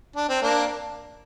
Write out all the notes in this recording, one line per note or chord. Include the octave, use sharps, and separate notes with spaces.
D4
C4
A#3 D4